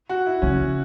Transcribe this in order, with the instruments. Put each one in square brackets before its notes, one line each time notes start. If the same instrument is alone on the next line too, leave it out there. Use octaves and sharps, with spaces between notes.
[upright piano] F#4
E4
[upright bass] C#3 [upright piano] C#4